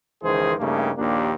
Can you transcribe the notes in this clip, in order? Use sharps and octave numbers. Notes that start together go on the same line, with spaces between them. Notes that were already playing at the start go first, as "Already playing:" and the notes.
C#2 D#3 E3 G#4 C5
G2 C#3 A3 A#3 D#4 G4
A#1 D#2 A#3 D4 F4 G4